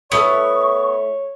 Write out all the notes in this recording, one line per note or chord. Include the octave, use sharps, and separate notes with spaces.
A3 B3 E4 A4 C#5 C#6